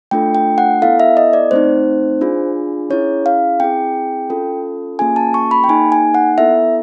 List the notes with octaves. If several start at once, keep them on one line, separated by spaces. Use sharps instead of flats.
A3 D4 F4 A4 G5
G5
F#5
B3 E4 A4 F5
E5
D#5
D5
A3 C4 D#4 C5
D4 F4 G#4
C#4 E4 G#4 C#5
F5
C4 E4 G#4 G5
C#4 F4 A4
A#3 C#4 F4 G#4 G#5
A5
C#6
B5
G5
A#3 D#4 G#4 G#5
G#5
F#5
B3 E4 A4 E5